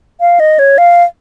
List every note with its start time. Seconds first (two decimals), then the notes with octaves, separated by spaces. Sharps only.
0.21 F5
0.40 D#5
0.59 C#5
0.78 F5